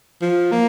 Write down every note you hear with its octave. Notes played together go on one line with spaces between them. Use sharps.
F3
A#3